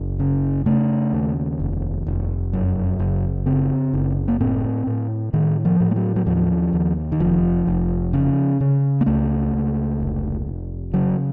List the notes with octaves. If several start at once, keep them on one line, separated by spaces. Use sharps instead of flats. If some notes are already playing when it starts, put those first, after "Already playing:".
Already playing: F#1
C#3
C#3 A3
D#2
F1
F1
F#2
F#1
C#3 C4
F#1
A#3
A2 C4
A2
A2 D#3
F3
A2
A3
F#3
F#3
D#2 F3
D#2
D#3
F1 F3
F1
C#3
C#3
A#3
C#2 A3
C#2
F1
F1
C#3 F#3